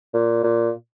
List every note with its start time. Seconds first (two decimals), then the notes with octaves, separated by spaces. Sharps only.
0.14 A#2
0.44 A#2